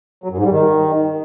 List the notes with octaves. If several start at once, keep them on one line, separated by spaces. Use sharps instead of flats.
F#3
F#2
G#2
G3
D#3